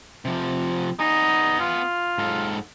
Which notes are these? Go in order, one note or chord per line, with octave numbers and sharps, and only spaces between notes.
C3 F3
B3 D#4 G#5
F4
G#2 A4